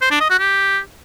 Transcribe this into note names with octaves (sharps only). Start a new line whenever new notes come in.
C5
D4
D#5
F#4
G4